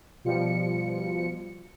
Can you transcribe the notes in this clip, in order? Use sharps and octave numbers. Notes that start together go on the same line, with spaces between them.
B2 F3 G3 C#7